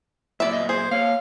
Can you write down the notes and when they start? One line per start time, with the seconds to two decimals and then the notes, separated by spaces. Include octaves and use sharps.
0.40 F#2 A#2 E4 D5 E5
0.53 D#5
0.69 G#4 C5
0.91 A#3 C#5 F5